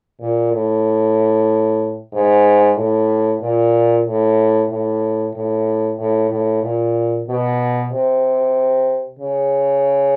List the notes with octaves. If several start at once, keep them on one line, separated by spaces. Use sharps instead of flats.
A#2
A2
G#2
A2
A#2
A2
A2
A2
A2
A2
A#2
B2
C3
C#3